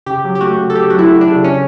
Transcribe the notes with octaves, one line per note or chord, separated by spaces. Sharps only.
C#3 G4
F#3
G4
A3 F#4
C#3
A4
C#3 G4
F#3 F#4
E4
A3
D4
C#3
C#4